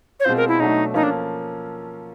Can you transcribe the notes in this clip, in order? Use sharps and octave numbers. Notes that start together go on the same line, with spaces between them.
C#5
B2 G#3 C4 F4 C5
A#4
E4
B2 F#3 A3 D4 D#4 F#4
F3 A#3 C#4 D#4 F4 A4
D4